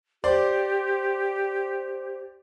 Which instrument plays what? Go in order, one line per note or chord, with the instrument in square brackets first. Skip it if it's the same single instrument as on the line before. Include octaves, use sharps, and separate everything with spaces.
[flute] G4 [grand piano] C5 D5 C6